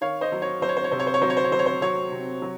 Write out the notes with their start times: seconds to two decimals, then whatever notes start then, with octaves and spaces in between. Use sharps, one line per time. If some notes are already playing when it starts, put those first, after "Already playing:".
0.01 D#3 C#5 F5
0.21 C5 D#5
0.32 F#3
0.42 C#5
0.62 F#3 C5
0.69 C#5
0.77 C5
0.84 C#5
0.91 C3 C5
1.00 C#5
1.07 C5
1.14 C#5
1.22 F#3 C5
1.30 C#5
1.37 C5
1.44 C#5
1.52 F#3 C5
1.59 C#5
1.66 C5
1.82 F#3 C#5
2.11 C3
2.42 F#3